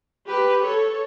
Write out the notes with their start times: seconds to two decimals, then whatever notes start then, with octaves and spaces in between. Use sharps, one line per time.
0.28 G4 B4
0.63 A4 C#5